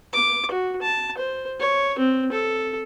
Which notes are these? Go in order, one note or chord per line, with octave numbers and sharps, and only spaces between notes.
D6
F#4
A5
C5
C#5
C4
A4